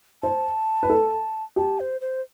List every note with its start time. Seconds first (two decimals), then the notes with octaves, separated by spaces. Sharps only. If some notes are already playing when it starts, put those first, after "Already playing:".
0.23 C5 A5
0.83 B4
0.90 A4
1.56 G4 A5
1.80 C5
2.01 C5